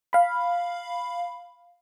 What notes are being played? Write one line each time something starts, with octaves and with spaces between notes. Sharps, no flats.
F5 B5